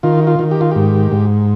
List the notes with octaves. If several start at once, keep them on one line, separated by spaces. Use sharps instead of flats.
D#3 F4
F4
D#3
G4
F4
G#2 G4
G#2